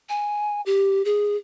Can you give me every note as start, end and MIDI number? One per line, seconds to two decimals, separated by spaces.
0.09 0.61 80
0.66 1.03 67
1.05 1.36 68